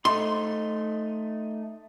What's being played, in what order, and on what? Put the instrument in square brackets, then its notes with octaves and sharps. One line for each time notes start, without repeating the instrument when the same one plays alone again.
[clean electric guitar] A3 D#4 [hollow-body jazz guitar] C6